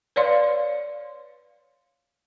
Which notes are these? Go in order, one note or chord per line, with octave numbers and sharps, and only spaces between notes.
B4 C#5 D5 F5 C6